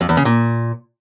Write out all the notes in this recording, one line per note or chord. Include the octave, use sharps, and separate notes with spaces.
F2
E2
C#3
A#2